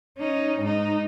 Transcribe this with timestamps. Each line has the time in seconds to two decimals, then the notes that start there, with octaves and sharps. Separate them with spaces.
0.18 C#4 D#4
0.61 G#2 D#4